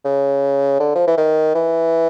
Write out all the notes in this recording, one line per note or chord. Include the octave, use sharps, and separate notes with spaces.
C#3
D3
F3
E3
D#3
E3